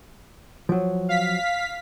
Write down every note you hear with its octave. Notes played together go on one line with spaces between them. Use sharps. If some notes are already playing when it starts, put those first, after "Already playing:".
F3 F#3
F5 B6